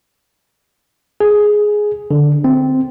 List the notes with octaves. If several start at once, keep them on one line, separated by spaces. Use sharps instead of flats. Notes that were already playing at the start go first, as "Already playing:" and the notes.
G#4
D3
C4